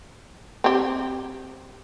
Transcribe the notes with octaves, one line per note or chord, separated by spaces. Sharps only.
C4 G4